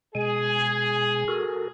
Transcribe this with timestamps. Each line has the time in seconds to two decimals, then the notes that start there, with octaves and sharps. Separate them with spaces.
0.15 B2 G#3 G#4 G#5
1.28 F#4 A4 A#4